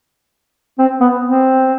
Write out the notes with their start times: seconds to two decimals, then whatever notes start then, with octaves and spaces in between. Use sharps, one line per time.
0.79 C4
1.01 B3
1.24 C4